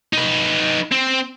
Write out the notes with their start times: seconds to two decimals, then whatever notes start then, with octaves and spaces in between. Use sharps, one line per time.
0.13 D#4 B4
0.91 C4